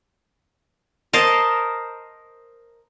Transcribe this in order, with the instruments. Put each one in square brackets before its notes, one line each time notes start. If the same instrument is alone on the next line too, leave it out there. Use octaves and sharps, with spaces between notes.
[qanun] A#4 C5 D#5 A5